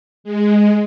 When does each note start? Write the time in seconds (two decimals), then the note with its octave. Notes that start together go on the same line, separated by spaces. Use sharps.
0.24 G#3